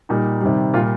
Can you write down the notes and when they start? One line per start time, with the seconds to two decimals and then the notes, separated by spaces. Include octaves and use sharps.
0.09 A#2 G3 D#4
0.41 C3 D#3 G3
0.74 A#2 G3 F4